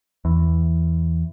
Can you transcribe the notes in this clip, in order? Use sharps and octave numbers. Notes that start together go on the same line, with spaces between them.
E2